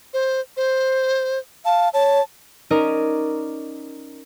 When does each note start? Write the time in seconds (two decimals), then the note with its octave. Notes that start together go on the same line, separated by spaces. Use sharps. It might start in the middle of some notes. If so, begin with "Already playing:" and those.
0.13 C5
0.57 C5
1.65 F5 A5
1.94 C#5 A5
2.70 C#4 D#4 A#4 D5 D#5